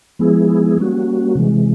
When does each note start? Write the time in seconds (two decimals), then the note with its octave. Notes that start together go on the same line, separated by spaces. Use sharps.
0.19 F3 G#3 B3 E4 G#4
0.78 G3 A#3 C#4 F#4
1.35 C3 E3 G#3